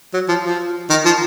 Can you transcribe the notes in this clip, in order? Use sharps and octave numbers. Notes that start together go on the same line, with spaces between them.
F#3
F3
F3
D#3
F3